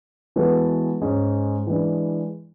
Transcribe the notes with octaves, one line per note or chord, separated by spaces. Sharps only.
E3 G#3 B3 F#4 A4
G#2 G#3 C#4
E3 G#3 D4